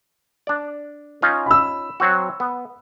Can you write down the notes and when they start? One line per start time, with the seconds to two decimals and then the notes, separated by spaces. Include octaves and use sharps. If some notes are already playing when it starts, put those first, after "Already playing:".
0.47 D4 D5
1.22 C#4 D#4 F4
1.46 B5 E6
2.00 F#3 C4 F#4
2.40 B3